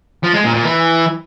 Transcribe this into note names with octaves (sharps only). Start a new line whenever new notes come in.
F3
G#3
A#2
A#2
E3